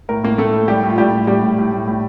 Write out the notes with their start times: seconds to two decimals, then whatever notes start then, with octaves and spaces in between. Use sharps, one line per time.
0.09 A2 A#4
0.23 A2 A#3 A#4
0.38 A2 A3 A4
0.53 A2
0.68 A2 G3 G4
0.83 A2
0.90 F4
0.98 A2 G3 G4
1.13 A2
1.27 A2 G3 G4
1.43 A2
1.58 A2
1.73 A2
1.87 A2